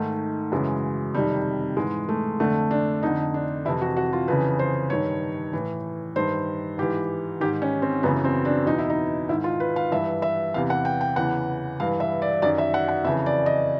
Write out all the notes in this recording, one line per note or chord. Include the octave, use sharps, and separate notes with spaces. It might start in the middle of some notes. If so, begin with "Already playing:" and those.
Already playing: G#2 D#3 A3
F#2 C#3 E3 G#3
F2 C3 D#3 G3
G#2 E3 G#3
A3
F2 D3 A3
D4
F2 D3 D#4
D4
F2 C3 E3 E4
F#4
F#4
F4
F2 C#3 E3 B4
C5
G2 D#3 C#5
A2 E3
G2 D#3 C5
G#2 E3 G4
G#2 D#3 G4
C#4
C4
F#2 C#3 E3 B3
C4
D4
E2 B2 D#4
E4
D#4
G#2 D#3 E4
F4
B4
F5
G2 E3 E5
E5
E2 C3 E3 F5
F#5
G5
G5
E2 C#3 E3 F#5
G2 E3 F5
E5
D5
F#2 D#3 D5
E5
F#5
F#5
F2 C#3 E3 E5
D5
D#5